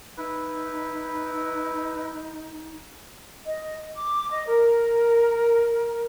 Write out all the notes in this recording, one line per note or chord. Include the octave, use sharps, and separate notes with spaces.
D#4 E4 B4
D#5
D6
D#5
A#4